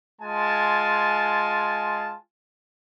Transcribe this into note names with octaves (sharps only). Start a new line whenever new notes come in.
G#3 F4 G#5 A5